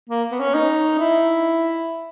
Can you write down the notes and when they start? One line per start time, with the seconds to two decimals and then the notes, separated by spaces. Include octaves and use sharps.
0.09 A#3
0.32 B3
0.40 C#4
0.54 D#4
0.99 E4